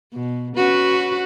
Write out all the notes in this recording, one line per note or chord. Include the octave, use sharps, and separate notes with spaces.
B2
C#4 F#4 B4